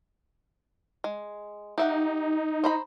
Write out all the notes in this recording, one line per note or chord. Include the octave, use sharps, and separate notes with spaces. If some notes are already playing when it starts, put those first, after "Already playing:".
G#3
D#4 G4 E5 F#5
C5 A#5 B5